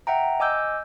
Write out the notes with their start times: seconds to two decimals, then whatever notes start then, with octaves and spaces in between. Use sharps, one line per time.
0.07 E5 F#5 G5 A#5
0.40 D#5 G#5 D6 E6 G6